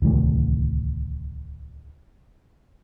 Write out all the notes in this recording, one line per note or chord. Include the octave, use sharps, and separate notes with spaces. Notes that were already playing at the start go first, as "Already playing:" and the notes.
D1 C2 D#3 A3